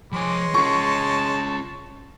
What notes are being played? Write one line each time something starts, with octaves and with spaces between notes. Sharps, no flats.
F3 G#3 C#5 G#5 C6 D6
C#4 F4 A5 C#6